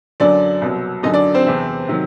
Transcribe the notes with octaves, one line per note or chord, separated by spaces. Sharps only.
F#2 D3 F#3 D4 D5
C2 B2 F#3
F#2 D3 F#3 D#4 D#5
D4 D5
C4 C5
E2 C3 E3
C3 D#3 F#3